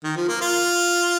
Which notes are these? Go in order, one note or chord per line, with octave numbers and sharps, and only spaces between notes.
D#3
F3
A#3
F4